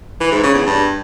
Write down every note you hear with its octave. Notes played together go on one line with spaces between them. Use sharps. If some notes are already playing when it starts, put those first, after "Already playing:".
E3
G#2
C#3
E2
G2